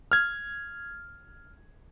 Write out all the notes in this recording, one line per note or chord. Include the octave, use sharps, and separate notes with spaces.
F6 G#6